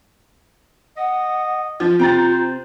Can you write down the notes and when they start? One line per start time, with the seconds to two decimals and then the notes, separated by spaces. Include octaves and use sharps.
0.97 D#5 F#5
1.80 F3 F4
1.99 C3 C5 G5 A#5 A6